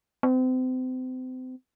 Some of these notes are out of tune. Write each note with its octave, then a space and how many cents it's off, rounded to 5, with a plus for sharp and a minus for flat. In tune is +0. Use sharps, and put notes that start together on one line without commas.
C4 -35